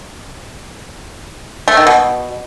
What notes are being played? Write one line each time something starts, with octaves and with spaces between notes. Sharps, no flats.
A3
D#3
B2